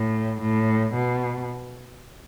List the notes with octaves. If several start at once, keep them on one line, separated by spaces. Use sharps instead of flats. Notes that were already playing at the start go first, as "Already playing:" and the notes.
Already playing: A2
A2
B2